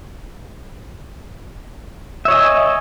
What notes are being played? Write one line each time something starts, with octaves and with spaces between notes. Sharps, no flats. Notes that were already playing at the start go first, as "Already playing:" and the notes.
C#5 D#5 E5 G#5